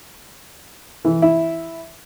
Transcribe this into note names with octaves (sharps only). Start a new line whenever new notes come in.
E3
E4